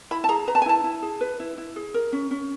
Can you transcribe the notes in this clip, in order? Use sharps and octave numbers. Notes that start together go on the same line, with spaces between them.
E4 B5
A5
G#4 A#5
B4 A#5
A5
G#5
E4 A5
E4
G#4
B4
E4
E4
G#4
A#4
C#4
C#4